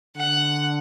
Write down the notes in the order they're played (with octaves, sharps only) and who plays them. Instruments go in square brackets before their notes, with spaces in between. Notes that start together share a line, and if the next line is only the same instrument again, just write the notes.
[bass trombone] D3 [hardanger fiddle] F#5